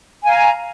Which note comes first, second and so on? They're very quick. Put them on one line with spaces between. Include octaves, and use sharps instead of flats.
G#5 F5 A#5